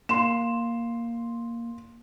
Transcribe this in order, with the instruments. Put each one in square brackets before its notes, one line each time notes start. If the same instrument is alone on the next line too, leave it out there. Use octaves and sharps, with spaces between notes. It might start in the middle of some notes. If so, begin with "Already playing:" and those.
[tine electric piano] A#3 [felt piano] C6 E7